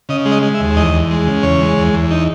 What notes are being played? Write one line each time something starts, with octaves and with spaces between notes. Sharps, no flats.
C#3 D#5
G#3
D#5
G#3
E5
D#2
E2 D#5
E2
G#3
C#3
E2 C#5
G#3
E2
E2
D#4